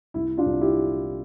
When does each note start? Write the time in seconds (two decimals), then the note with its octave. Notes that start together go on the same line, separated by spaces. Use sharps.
0.14 C2 E4
0.37 D4 F4
0.46 C2
0.61 E4 G4